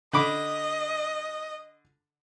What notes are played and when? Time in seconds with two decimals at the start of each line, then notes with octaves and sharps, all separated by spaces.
0.13 D3 D#5 B5 D6